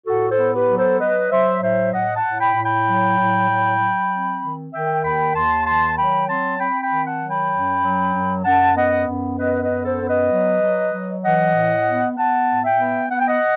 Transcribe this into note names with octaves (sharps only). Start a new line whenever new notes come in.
A2 F#4 A4
A4 C5
B3
G4 B4
F#3
A4 C5
F#3 B4 D#5
F#3 C5 E5
A2 C5 E5
A2 D#5 F#5
F#5 A5
A2
G5 B5
A2
G5 B5
F#3
A2
F#3
F#3
C4
D#3
D#3 E5 G5
D#2 G5 B5
D#2 A5 C6
D#3 A5 C6
F#3 G5 B5
C4 A5 C6
C4 G5 B5
G5 B5
D#3
F#5 A5
F#3
G5 B5
F#2
F#3
F#2
F#2 F#5 A5
B3 D#5 F#5
F#2
B3 B4 D#5
B4 D#5
F#2
A4 C5
B3
B4 D#5
F#3
F#3
F#3
E3 D#5 F#5
A2
B3
B3 F#5 A5
A2
E5 G5
B3
B3 F#5
G5
D#5 F#5